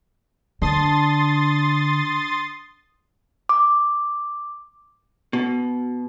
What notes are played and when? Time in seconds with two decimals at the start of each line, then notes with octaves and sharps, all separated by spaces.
0.62 D3 D4 C6 D#6 A6
3.49 D6
5.33 B2